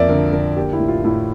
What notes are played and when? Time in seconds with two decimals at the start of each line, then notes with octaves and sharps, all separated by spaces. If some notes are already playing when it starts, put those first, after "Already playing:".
Already playing: F2 A#3 D5 E5
0.09 D3 A#4
0.32 D3 A#4
0.56 A#3 G4
0.73 E4
0.80 A2
0.88 F4
1.04 A2 E4